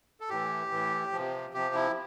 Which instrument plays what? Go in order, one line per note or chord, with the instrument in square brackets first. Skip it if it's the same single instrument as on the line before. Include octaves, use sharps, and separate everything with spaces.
[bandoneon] A4
A2 E3 G4
A2 E3
F3
C3
C3 F3 G4
E4